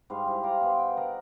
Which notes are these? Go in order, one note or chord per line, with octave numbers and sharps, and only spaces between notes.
G#2 G3 C5 F5
E4 G4
F4 F5 A#5 D6
B2 G#4 C5 G5
G5
A#4 D#5 F#5